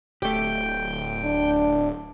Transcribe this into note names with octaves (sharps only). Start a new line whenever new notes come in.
D1 A3 G4 G5
D4